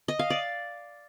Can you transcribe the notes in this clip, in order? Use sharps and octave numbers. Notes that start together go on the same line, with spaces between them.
D#5
F5
D5